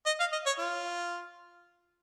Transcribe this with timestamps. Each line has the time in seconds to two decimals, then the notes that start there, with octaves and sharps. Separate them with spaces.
0.06 D#5
0.20 F5
0.33 D#5
0.46 C#5
0.59 F4